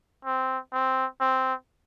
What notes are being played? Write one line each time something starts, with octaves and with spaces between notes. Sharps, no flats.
C4
C4
C4